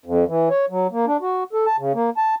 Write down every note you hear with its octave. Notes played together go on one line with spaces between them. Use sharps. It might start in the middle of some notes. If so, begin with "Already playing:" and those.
F2
E3
C#5
F#3
A#3
D4
F#4
A4
A5
C#3
A#3
A5